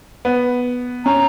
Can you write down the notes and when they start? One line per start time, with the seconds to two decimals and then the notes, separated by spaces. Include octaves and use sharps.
0.25 B3
1.05 C#4 A#5